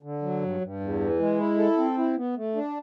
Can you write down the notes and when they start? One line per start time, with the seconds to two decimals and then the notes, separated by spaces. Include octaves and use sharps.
0.03 D3
0.22 F#3
0.42 G2
0.61 G2
0.80 E2
1.00 E3
1.19 G#3
1.39 E4
1.58 A4
1.77 C4
1.98 E4
2.17 B3
2.36 A3
2.55 D4